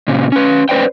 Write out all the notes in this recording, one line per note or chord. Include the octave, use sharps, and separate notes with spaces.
A#2 C#3
C#4 B4
C#4 B4 C5 D5 G5